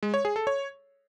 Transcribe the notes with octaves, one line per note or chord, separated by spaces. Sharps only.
G#3
C#5
G#4
A4
C#5